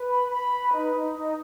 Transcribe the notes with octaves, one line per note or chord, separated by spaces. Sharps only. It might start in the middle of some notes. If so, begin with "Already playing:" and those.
Already playing: B4
B5
B5
B4
D#4
D#4
D#4